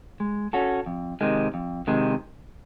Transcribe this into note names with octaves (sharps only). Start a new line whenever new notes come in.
G#3
C#4 F#4 A4
F2
C3 D#3 G#3
F2
C3 D#3 G#3